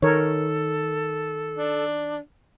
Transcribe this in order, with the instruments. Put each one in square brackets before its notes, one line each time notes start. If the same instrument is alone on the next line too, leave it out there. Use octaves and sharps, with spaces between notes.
[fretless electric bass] D#3 [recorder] A4 [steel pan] A#4 C#5
[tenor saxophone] D4